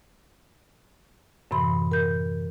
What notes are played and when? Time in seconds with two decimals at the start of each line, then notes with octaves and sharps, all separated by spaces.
1.51 F#2 A2 C3 E3 B5 C6
1.92 A#4 G6